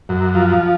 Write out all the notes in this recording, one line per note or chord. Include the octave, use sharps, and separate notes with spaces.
F#2
F3